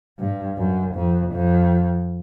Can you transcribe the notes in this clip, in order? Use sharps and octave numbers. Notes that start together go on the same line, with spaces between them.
G2
F#2
F2
F2